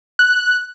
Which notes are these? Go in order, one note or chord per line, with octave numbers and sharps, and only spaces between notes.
F#6